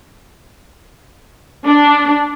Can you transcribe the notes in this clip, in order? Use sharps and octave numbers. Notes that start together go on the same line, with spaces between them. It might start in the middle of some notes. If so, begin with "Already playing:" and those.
D4